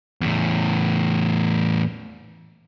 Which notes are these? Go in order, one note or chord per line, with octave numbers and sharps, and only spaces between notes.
E2 A2